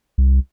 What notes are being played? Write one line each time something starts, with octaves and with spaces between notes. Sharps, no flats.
C2